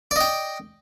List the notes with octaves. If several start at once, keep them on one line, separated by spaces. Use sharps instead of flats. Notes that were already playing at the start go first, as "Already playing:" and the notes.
D5 D#5 G5